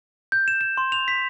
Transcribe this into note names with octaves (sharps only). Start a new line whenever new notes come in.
G6
E7
E7
C6
F7
B6